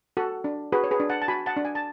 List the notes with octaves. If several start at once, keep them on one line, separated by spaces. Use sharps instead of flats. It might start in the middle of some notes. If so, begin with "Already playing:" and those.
F#4 A4
D4
F#4 G#4 B4
C#5
G#4 B4
D4
F#5 A5
A5
F#4 G#5 B5
F#5 A5
D4
G#5
A5